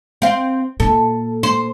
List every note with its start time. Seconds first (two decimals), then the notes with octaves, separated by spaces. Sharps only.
0.22 C4 F5
0.80 A#2 A4
1.43 C5